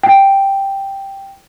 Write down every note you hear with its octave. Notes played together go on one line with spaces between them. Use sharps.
G5